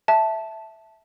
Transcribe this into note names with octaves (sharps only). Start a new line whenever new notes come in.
E5 A5